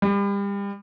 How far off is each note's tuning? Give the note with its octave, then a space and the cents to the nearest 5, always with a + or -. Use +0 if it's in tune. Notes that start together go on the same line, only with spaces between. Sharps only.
G3 +35